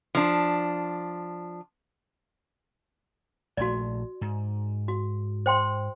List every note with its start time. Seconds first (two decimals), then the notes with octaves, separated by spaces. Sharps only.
0.15 F3 D4
3.57 A#1 D#3 A3 F#4 D5
4.21 G#2
4.88 F#4
5.46 C5 G5 C6